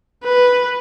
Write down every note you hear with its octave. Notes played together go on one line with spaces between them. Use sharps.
B4